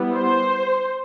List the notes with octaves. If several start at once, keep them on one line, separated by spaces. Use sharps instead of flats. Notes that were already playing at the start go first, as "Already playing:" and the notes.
Already playing: G3 B3 E4
C5